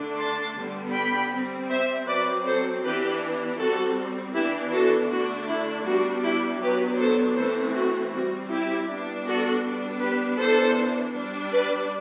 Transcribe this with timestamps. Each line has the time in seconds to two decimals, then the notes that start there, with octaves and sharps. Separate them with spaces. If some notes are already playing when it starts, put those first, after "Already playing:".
Already playing: D3 A3 D4
0.18 A5 C6
0.56 D3 G3 B3
0.93 G5 B5
1.31 G3 C4
1.70 C5 E5
2.07 F#3 C4 B4 D5
2.45 A4 C5
2.83 E3 B3 D4 G4 B4
3.58 G3 C4 F#4 A4
4.34 E3 B3 D4 E4 G4
4.72 F#4 A4
5.10 D3 A3 D4 F#4
5.48 E4
5.85 G3 B3 D4 F#4
6.23 E4 G4
6.61 F#3 B3 D4 G4 B4
6.98 A4 C5
7.36 E3 A3 C4 A4 C5
7.75 F#4
8.12 G3 C4 F#4
8.50 E4 G4
8.87 G3 B3 D4
9.25 F#4 A4
9.63 G3 B3 D4
10.01 G4 B4
10.39 E3 B3 D4 A4 C5
11.14 G3 D4
11.52 B4 D5